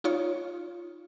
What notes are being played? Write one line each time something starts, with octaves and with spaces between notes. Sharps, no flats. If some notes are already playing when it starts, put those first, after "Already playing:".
D#4 F4 C#5